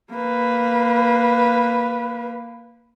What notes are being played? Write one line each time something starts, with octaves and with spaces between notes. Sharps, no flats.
A#3 B4